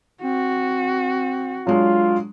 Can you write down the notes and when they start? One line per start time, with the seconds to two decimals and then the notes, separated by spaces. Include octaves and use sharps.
0.23 C4 F#4
1.67 F#3 G#3 D4 F4